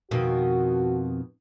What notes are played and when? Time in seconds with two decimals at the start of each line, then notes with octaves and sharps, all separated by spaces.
0.11 F2 B2 D#3 F#4